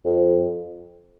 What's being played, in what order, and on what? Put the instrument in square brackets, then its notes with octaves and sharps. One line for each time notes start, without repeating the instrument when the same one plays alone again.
[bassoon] F2